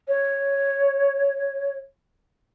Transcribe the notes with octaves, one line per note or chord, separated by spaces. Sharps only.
C#5